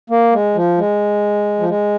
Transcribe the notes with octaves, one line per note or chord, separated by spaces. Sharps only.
A#3
G#3
F3
G#3
F3
G#3